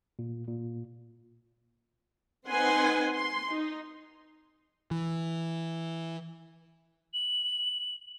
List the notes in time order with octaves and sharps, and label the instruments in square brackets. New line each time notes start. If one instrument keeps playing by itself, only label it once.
[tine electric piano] A#2
A#2
[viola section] C4 D#4 B4 F#5 G#5 C6
C6
D#4
[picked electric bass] E3
[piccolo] F#7